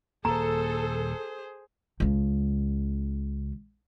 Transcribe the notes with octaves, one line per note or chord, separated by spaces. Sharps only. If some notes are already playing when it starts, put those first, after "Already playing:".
D#1 A#3 G#4 A4 C5 A#5
C#2 C#3